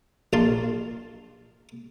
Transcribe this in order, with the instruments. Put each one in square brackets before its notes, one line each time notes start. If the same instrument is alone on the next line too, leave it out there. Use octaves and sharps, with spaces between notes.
[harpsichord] A#1 F4 A5 C6